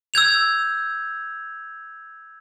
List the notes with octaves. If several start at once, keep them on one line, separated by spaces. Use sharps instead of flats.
E6 G6 G#6 F7